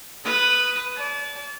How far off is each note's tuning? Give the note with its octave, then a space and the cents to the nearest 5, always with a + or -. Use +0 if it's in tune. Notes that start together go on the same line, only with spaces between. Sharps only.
B4 +0 D#6 +0
D5 -35 A5 -35